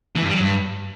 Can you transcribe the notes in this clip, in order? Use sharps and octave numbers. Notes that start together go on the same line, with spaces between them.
E3
G2
G3
F#3
G2